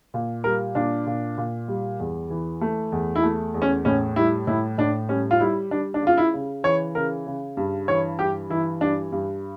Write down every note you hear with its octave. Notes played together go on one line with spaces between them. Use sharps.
A#2
G3 A#4
A#2 D4
A#2
A#2
G3
E2
E3
A3
E2
E4
A3
E2
C#4
A2 C#4
G3 E4
A2 E4
A2 D4
G3 C#4
F4
G3 E4
G3 D4
D4
C#3 F4
E4
C#3
E3 C#5
C#3 A#4
C#3
G2
E3 C#5
G2 G4
E3 E4
G2 D4
G2